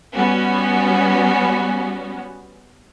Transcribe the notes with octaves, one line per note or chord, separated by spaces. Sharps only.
G3 B3 C#4 F#4